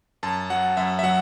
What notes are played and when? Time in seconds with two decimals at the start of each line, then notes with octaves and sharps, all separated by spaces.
0.23 F#2 A5
0.50 F#3 F#5
0.77 F#2 E5
0.99 E5
1.03 F#3 F#5